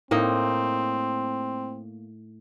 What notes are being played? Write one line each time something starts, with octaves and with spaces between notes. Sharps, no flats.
A2 A#3 C4 D#4